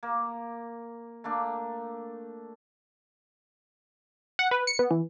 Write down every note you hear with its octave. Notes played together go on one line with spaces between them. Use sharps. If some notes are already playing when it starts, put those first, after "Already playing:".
A#3
A3 A#3 D4
F#5
B4
C#7
B3
E3